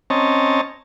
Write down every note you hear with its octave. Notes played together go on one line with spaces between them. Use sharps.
C4 C#4 C#5 D#5 A5 A#5